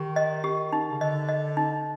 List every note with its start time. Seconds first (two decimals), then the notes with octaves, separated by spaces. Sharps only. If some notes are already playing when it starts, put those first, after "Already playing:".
Already playing: D#3 G4
0.16 D#5
0.44 G4
0.73 D#4
0.90 C#3
1.00 D3 D#5
1.29 D#5
1.57 D#4